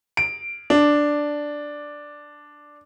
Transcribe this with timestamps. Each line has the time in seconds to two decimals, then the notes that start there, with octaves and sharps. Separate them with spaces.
0.17 D7
0.70 D4